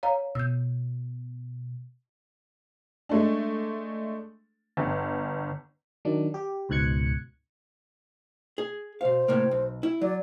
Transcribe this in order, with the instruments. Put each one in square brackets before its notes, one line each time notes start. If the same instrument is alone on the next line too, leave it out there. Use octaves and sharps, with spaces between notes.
[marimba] C#5 F5 A#5
[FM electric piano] B2 [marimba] E6 G6
[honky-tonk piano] G#3 A3 D4
G1
[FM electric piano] D#3 F#3 D4
G4
C#2 G#2 B2 F#6 G#6 C#7
[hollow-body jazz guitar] G#4
[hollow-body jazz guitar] B2 F5 [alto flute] C5
[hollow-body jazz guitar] A2 C3 A#3
B1
E4
[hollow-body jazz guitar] F#3 [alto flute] D5